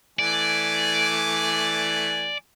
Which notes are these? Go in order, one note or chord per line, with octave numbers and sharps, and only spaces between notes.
E3 A3 D5 G#5